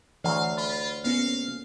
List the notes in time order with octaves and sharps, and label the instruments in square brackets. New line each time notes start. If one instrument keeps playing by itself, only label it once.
[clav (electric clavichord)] D2 F#3 G#5 [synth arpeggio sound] E3 [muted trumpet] F5
[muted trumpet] F4 [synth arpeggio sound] B5
[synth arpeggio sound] A#3 B3 C#4 [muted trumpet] F5